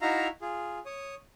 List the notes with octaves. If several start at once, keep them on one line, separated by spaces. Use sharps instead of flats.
D#4 E4 F#4 E5 F5 A#5
F4 G#4
C#5 D#6